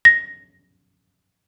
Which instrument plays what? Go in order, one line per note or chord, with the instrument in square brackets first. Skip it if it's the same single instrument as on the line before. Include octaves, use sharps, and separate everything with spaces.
[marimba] A#6